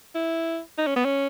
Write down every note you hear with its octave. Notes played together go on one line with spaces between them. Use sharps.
E4
D#4
C#4
B3
C#4